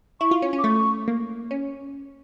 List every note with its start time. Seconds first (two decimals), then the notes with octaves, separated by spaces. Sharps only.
0.20 E4 C#6
0.31 F4
0.42 C#4
0.53 C#4
0.58 D6
0.64 A3 C#6
1.08 A#3
1.51 C#4